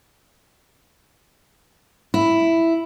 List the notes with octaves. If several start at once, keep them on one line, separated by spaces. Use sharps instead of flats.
E4